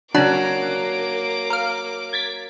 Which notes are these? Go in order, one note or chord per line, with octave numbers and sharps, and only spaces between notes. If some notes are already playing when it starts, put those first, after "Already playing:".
C#3 F#3 A#3 D4 D6
A#4 F5
G#6 A6 B6